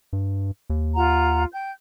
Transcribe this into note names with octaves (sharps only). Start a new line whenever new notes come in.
G2
D#2
F4 F#5 A#5
G5 G6